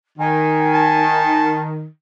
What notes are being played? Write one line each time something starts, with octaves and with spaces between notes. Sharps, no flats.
D#3 G#5
A5